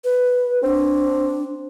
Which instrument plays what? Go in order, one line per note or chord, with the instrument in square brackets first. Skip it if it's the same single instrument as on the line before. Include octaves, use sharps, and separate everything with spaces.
[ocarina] B4
[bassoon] C4 [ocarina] D4